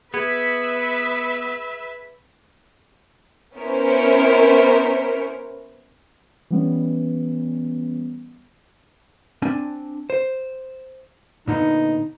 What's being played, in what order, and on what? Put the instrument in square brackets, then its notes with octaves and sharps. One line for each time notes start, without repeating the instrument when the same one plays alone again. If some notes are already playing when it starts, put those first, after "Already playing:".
[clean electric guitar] B3 [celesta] G#4 G#6 [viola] B4 E5
[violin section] B3 C#4 E4 A#4 C5 C#5
[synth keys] E3 G3 B3 C#4
[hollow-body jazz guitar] C4 D4 G#5
C5
[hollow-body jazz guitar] A#2 D3 B3 [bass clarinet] D#4